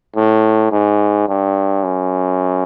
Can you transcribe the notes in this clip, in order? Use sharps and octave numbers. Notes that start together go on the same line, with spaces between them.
A2
G#2
G2
F#2